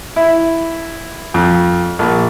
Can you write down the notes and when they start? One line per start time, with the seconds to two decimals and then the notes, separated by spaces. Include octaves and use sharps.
0.16 E4
1.34 F2
1.99 A#1